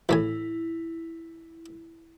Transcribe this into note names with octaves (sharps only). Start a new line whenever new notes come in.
E2 A2 E4 G#5